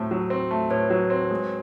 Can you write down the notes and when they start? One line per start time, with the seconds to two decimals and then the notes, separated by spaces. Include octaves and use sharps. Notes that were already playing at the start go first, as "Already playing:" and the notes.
Already playing: A2 F#3 A3 C4
0.11 F#3
0.30 C4
0.51 A3
0.70 A2 B4 C#5
0.90 F#3
1.10 C4
1.31 G#3